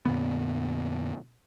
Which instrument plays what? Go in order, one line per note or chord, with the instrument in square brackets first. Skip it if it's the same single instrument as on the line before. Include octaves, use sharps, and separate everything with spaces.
[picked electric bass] F2 A#2 D3 B3